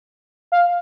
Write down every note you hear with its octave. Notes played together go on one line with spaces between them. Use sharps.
F5